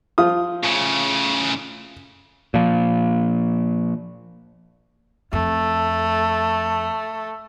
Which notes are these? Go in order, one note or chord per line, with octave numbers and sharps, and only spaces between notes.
F3 F4 D#6
A2 C#3
A#2 F3
F2 A3